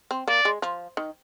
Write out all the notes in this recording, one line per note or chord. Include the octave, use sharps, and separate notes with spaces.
C4
A#3 D5
G#3
F3
D#3